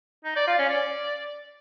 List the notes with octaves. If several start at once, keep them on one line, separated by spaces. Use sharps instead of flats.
D#4
D5
F4
C#4
D5